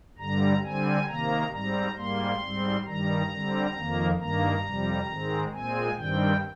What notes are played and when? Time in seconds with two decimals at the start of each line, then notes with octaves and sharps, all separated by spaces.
0.18 G2 D3 G3 A#5
0.63 D3 G3 C4 G#5
1.08 C3 D#3 A#3 A#5
1.52 G#2 G3 C4 A#5
1.97 G#2 G3 A#3 C6
2.41 G#2 G3 C4
2.86 G2 D#3 G3 A#5
3.31 D3 G3 C4
3.75 F2 D#3 A#3
4.19 G2 D#3 A#3 A#5
4.64 F2 C3 G3
5.09 G#2 D#3 G#3 C4
5.52 A#2 G#3 C4 G#5
5.97 G2 D#3 G3 C4 G5